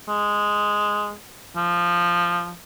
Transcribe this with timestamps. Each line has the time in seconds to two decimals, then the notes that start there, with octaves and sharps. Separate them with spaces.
0.08 G#3
1.56 F3